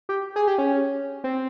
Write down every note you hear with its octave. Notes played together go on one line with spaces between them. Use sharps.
G4
G#4
G4
C#4
C4